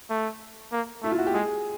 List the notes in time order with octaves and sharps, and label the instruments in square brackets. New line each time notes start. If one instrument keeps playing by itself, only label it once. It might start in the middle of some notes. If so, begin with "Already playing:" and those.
[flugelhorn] A3
A#3
[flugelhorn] A3 [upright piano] E4
[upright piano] F4
F#4
G4
[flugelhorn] G#3 [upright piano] G#4